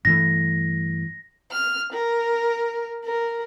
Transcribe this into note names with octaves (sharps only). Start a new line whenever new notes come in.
G2 E3 A3 A#6
F6
A#4
A#4